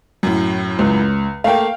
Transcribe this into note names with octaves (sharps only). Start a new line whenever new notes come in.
F#2 A2
C#2
A3 A#3 F5 G5